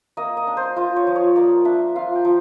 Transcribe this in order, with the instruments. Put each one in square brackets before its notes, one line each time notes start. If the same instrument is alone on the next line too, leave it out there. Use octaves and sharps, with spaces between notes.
[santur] A#3 D#5
D#5
D4
C5
F4 C5
C#5
F3
C#5
A#3 D5
D4 E5
F4 F5
G5
F3